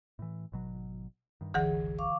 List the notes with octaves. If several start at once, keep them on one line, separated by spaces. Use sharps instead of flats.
A2 E3
G#1 B2 F#3
G2 D#3
F#1 C2 D3 E3 G#4 F#5
F5 C#6 D6